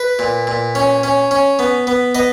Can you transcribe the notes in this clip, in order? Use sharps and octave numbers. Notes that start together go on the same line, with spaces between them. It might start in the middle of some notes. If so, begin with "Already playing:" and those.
Already playing: B4
A#2
A#2
C#4
C#4
C#4
B3
B3
B3 D#5